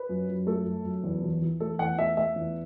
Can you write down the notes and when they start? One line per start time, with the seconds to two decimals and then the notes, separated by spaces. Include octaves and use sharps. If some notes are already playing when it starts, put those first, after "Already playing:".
Already playing: B4
0.09 F#2
0.29 F#2
0.47 A3 A4
0.66 F#2
0.85 F#2
1.04 E2
1.23 E3
1.42 E3
1.60 A3 A4
1.79 E2 F#5
1.98 A3 E5
2.17 A3 E5
2.36 E2